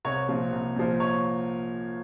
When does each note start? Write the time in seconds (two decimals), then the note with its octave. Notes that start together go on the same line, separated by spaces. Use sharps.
0.05 C2 C#5
0.28 A#2 F3
0.52 C2
0.76 A#2 F3
1.00 C#5